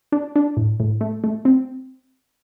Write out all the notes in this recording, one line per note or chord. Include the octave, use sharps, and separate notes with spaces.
D4
D4
A2
A2
A3
A3
C4